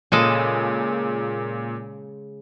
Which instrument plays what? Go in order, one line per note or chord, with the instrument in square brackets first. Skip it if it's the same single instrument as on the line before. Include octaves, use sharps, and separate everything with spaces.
[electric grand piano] A#2 [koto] C#3 G#3 A4